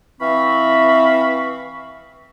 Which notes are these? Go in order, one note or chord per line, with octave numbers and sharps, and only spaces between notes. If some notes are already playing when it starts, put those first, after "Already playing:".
E3 C4 E5 F5 B5 C#6